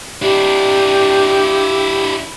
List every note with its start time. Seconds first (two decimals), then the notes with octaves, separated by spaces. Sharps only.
0.22 D4 E4 G4